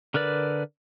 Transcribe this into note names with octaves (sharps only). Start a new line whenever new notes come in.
D3 A#4 B4 D5